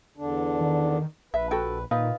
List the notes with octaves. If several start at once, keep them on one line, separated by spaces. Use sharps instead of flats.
E2 D3 D4
D#3
A#1 B4 E5
F#4 A4 G5
A#2 D#3 D#4 F4 B4